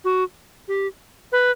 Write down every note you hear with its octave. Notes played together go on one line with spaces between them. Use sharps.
F#4
G4
B4